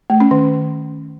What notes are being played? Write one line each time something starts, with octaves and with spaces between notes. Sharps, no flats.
A3
C#4
D#3